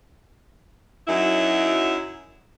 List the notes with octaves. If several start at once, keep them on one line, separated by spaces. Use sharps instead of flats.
F#2 F#3 D#4 E4